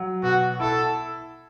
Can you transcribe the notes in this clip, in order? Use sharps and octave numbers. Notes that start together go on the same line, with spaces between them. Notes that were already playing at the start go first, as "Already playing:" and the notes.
Already playing: F#3
B2 F#4
E4 A4